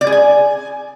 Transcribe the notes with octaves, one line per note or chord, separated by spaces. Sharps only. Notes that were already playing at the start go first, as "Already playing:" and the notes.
D5
G#4
G#5